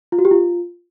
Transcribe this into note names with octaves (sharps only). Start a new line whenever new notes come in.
F4
F#4
G4
F4